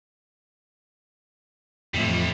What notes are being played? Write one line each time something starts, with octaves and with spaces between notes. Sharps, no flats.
F2 A2 D3 E3 G3 E5